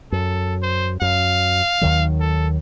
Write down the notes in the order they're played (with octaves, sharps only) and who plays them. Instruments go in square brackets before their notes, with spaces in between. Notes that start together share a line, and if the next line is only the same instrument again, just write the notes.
[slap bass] F#2 [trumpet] A4
[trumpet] C5
[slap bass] F#2 [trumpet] F5
[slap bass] D#2 D#3 F#3
[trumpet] A4